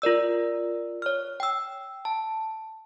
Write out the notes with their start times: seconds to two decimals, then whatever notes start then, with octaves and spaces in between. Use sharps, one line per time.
0.02 F4 A#4 D5 E6
1.02 C#5 F6
1.40 G5 E6
2.05 A5